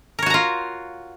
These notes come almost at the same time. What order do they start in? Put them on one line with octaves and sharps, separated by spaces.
A#4 C#5 F#4 A#5 F4